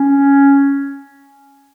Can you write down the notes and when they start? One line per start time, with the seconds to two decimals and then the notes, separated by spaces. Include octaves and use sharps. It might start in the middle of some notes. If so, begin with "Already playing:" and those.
Already playing: C#4